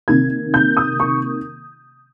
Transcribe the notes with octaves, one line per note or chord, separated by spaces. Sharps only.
C3 D#3 A#3 G#6
G6
D#6
C#6